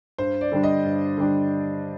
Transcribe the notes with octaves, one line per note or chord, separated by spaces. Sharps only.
G2 C5
D5
D3 G3 D4
D#5
G2
D3 G3 D4